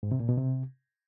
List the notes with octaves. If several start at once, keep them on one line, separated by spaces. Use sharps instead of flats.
G#2
C3
A#2
B2
C3